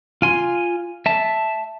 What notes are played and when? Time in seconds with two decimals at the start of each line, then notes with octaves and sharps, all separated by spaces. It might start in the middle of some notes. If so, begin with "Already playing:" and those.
0.22 F4 G#5 C6
1.06 E5 A5